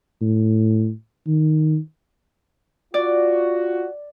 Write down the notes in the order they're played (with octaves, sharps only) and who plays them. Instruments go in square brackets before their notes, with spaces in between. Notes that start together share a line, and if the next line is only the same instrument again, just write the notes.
[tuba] A2
D#3
[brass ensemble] F4 F#4 [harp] D5